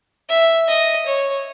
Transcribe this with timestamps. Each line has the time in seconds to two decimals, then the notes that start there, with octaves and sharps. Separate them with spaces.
0.29 E5
0.68 D#5
1.06 C#5